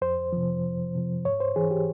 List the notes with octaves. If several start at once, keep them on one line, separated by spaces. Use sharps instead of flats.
F2 C5
C3 F3
F2
C3 F3
G#2 C#5
C5
E3 G#4
G4